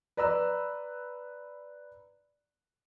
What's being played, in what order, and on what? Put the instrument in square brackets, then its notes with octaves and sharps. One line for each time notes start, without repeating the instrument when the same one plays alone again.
[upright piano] B4 D5 A#5 B5 E6